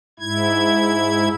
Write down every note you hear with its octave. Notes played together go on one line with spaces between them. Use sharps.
G#2 E4 G#6